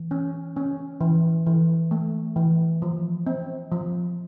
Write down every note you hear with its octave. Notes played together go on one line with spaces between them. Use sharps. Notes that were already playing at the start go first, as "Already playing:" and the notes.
Already playing: E3
C#4
C#4
E3
E3
A3
E3
F3
C4
F3